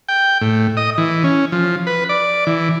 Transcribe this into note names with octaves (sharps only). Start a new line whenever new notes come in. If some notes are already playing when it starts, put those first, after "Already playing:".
G5
A2
D#5
E3
C#4
F3
B4
D5
E3